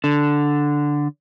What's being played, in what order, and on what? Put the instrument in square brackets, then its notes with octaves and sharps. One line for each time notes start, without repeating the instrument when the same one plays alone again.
[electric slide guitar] D3